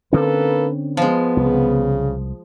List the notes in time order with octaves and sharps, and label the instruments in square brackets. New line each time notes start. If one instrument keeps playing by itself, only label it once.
[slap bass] D3 C4 C#4 [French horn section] A#3 A4 B4
[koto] F3 G#3 [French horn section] B3
[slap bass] C2 [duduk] C#3